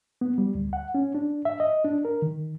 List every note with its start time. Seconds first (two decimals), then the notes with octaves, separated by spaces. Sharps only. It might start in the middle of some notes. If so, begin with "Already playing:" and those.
0.21 B3
0.38 G3
0.55 D2
0.73 F#5
0.95 C#4
1.15 D4
1.45 E5
1.60 D#5
1.84 D4
2.05 A#4
2.22 D#3